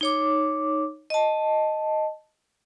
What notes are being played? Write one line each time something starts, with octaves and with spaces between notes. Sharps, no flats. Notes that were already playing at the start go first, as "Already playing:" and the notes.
D#4 C#5 D6
D#5 A5